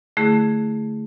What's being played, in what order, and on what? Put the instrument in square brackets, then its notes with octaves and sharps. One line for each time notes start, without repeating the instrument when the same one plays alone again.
[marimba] D3 A3 E4 G#4